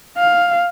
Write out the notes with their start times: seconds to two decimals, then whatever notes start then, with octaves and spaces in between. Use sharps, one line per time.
0.17 F5